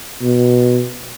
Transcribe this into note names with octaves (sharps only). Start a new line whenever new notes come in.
B2